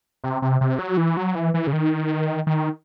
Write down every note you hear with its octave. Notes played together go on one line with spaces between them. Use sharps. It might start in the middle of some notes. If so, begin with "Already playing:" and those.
C3
C3
C3
F#3
E3
F#3
E3
E3
C#3
D#3
D#3